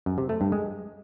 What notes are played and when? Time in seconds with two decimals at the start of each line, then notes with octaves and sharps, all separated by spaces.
0.06 F#2
0.18 C3
0.29 A3
0.41 G2
0.52 G#3